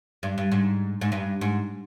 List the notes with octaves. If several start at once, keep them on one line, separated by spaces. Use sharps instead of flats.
G2
G2
G#2
G#2
G2
G#2